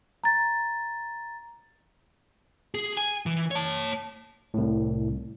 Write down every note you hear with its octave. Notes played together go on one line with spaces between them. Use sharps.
A#5 A6
G#4
G#5
E3
C#5 A5
C2 A2